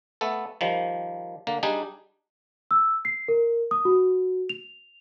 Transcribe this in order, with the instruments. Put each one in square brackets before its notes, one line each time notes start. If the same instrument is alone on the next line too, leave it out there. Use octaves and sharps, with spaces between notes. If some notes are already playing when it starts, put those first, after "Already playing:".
[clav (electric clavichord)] A3 B3 A4
D#3 F3 G3
D3 A#3
G3 D4 D#4 G#4
[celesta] E6
C7
A#4
D#6
F#4
F7